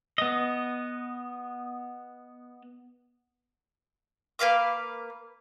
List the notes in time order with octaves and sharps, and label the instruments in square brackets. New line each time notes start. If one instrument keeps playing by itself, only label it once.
[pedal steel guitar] B3 D#5
[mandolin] A#3 B4 F5 D6